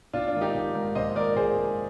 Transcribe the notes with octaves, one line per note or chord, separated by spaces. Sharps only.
A#1 D4 F4
D4 F4
G#2 D#3
D#4 G4
A#1
G#2 D#3
A#1 C5 D#5
G#2 D#3 A#4 D5
A#1 G#4 C5
G#2 D#3